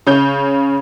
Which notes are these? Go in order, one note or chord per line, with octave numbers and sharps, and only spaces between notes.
C#3 C#5 G6